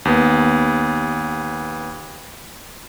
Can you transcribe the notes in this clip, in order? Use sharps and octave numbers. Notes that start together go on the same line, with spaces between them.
D#2 B3